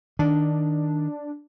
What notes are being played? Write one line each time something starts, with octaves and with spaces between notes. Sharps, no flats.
D#3 D4